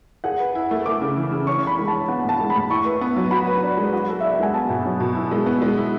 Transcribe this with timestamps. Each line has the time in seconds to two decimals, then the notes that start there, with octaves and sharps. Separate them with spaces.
0.24 G#4 F#5
0.39 B4
0.55 E4
0.71 A3
0.86 A3 D6
1.01 C#3
1.16 E3
1.32 C#3
1.47 C#4 C#6
1.63 E3 B5
1.79 G#3
1.88 E3 A5
2.08 B3 F#5
2.24 A2 A5
2.40 G#3
2.50 B5
2.55 A2
2.70 E4 C#6
2.85 B4
3.01 B3
3.16 F#3
3.31 F#4 B5
3.47 B4
3.63 D4
3.77 G#3
3.93 F#4
4.08 A4
4.21 D4 E5
4.32 F#5
4.39 G#3 G#5
4.54 B3 A5
4.69 B2
4.85 F#3
5.00 B2
5.15 E4
5.31 G#3
5.46 B3
5.62 G#3
5.77 E4